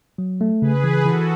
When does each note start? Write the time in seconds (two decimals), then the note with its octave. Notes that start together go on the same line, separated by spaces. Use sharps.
0.18 F#3
0.41 A3
0.62 C#3 G#4 B4
0.84 E3
1.06 E3 F#4 A4